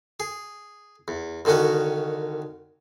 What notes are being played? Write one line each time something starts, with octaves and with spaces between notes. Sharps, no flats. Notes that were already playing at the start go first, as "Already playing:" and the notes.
G#4
E2
C2 D3 D#3 C#4 F#4